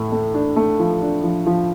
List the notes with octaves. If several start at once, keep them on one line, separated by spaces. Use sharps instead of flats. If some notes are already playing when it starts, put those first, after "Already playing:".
Already playing: A2 A3
A3
D4
A3
F3
D4
F3
F3